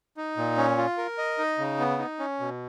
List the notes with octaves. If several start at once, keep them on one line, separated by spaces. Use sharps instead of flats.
D#4
A#2
C#4
F4
A#4
D#5
D#4
C#3
B3
D#4
C#4
B2